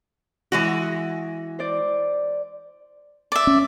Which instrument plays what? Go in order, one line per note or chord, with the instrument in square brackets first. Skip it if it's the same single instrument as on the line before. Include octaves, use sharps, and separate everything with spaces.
[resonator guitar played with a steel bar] E3 G#3 F#4
[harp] C5 D5
[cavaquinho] D5 E5
[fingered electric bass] C#4